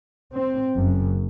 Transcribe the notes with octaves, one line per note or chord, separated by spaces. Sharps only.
C4
F#1 F#2